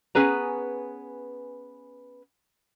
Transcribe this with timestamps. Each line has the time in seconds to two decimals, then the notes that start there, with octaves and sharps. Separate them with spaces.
0.15 B3 C#4 G#4 B4 A#5